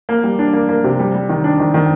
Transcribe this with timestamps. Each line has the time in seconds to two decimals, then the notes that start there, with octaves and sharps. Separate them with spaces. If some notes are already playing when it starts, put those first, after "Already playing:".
0.09 A#3
0.24 G3
0.39 D4
0.53 A#3
0.69 A#3
0.84 C3
0.99 G3
1.14 G3
1.29 D#3
1.44 D4
1.59 D#3
1.74 D#3